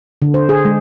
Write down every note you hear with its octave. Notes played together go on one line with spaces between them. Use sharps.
D3
C5
G#4
G#3